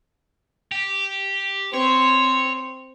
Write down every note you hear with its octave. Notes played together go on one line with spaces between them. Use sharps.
G4
C4 C#5